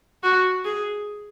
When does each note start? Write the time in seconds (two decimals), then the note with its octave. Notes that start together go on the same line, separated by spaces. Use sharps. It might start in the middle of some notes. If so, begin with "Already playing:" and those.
0.23 F#4
0.65 G#4